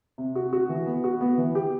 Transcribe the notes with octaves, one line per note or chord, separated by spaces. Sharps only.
C3
F#4
F#4
E3
B3
F#4
B3
E3
G4